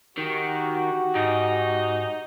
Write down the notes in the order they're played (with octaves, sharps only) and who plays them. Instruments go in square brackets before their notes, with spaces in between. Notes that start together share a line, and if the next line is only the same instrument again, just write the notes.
[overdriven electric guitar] D#3 [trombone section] F#4 G4
[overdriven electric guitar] G#2 [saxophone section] D#4